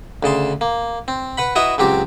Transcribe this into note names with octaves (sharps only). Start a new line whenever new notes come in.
D2 C#3 A5 C6
A#3
C4
B4 F#5 B5
E4 F#4 B4 D#5 E5 A#5
C#2 F#3 C4 G4 D6